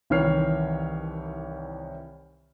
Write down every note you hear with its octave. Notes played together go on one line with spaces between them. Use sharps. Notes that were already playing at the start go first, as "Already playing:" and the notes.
C2 D#3 E3 C#5 F6 C7